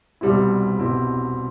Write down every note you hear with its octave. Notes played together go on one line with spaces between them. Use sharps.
C2 B2 G3 C4 E4
C2 B2 G3 C4 E4